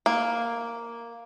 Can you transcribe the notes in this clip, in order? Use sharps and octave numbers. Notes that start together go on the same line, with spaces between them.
A#3